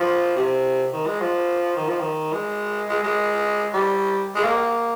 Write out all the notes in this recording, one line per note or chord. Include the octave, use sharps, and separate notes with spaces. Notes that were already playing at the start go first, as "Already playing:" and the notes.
Already playing: F3
C3
D#3
G#3
F3
D#3
F3
D#3
G#3
G#3
G#3
G3
G#3
A#3